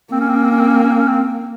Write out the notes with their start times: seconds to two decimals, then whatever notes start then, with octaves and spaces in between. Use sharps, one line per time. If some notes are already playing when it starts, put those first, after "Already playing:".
0.12 A#3 C4
0.21 C#4
0.28 C4
0.36 C#4
0.44 C4
0.51 C#4
0.59 C4
0.68 C#4
0.75 C4
0.84 C#4
0.92 C4
0.99 C#4
1.08 C4